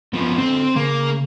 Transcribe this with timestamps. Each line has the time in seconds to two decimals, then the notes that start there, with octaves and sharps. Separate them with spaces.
0.13 F#2 F3 B3
0.38 D3 C4 A4 C5
0.76 C#3 A#3